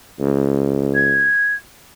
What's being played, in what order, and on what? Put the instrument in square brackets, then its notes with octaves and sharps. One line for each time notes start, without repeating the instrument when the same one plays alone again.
[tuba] C#2
[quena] G#6